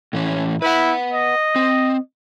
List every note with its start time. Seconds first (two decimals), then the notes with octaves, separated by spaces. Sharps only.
0.13 A2 E3 C#4
0.62 E4 B4 F#5
1.13 D#5
1.56 C4